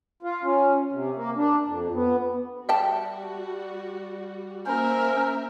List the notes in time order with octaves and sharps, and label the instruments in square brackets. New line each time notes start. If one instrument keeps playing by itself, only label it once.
[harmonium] F4
C#4
C3
A#3
D4
F2
B3
[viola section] G3 F#4 [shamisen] E5 G5 A5
[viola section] A#3 E5 [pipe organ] C#4 C5 [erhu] A#4